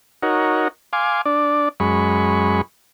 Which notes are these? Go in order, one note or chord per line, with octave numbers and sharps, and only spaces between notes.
D#4 F#4 A#4 C#5
F5 G#5 C6 D6
D4 D5
F#2 G#3 B5 C#6